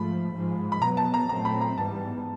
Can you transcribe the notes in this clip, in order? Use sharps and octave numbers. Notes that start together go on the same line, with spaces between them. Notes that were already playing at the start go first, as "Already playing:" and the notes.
Already playing: G#2 F3 A3 B5
G#2 F3 G#3
B5
B2 F#3 B3 A#5
A5
A#5
A#2 F#3 A3 C4 A#5
B5
A#5
G#2 E3 G3 B3 A5